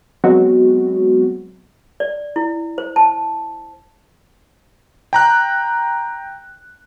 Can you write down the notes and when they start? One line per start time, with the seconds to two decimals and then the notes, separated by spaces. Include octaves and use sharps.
0.24 F#3 G#3 B3 C4 F#4
2.00 D5
2.36 E4
2.78 C5
2.96 A5
5.13 G5 A#5 F#6